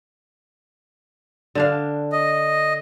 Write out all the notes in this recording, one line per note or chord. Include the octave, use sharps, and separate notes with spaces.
D3 D4 F5
D#5